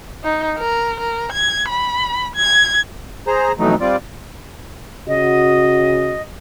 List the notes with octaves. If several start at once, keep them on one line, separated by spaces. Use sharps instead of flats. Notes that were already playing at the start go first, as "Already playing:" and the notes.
D#4
A#4
A#4
G#6
B5
G#6
G#4 C5 A#5
F2 B2 E3 F#3 A3 D#4
G3 C4 F4 D5
C#3 F#4 D#5